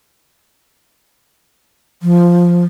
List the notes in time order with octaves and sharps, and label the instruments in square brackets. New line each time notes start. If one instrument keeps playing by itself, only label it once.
[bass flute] F3